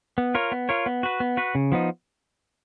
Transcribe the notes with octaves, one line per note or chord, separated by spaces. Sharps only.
B3
F4 A#4 C#5
B3
F4 A#4 C#5
B3
F#4 B4
B3
F#4 B4
C#3
F3 B3 D#4